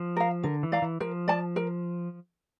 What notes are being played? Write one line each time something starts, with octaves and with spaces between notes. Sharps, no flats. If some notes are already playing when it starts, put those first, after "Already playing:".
Already playing: F3
A#4 F5
D3 A#4
E3
D5 F5 A#5
E3
F3 A#4
D5 A5
A#4